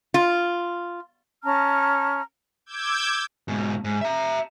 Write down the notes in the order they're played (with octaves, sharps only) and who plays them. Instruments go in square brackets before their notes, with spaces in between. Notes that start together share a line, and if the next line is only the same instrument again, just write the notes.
[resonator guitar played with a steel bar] F4
[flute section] C#4 A5 A#5 F6
[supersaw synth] D6 E6 G6 G#6
[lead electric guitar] G#2 B2
G#2
E5 A#5